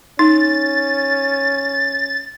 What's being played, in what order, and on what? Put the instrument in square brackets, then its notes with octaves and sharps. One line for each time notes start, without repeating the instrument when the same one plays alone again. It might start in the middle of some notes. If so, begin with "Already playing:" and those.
[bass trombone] C#4 [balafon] D#4 [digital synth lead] A6